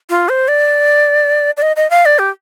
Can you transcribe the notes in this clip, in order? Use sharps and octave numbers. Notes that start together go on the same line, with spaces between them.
F4
C5
D5
D5
D#5
D#5
F5
D5
G4